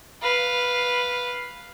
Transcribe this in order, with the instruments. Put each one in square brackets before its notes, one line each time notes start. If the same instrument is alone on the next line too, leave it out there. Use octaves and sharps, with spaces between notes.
[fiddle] B4 F5